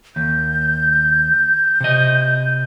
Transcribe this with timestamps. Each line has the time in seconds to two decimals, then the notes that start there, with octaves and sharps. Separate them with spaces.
0.16 D#2 G6
1.80 C3 D#5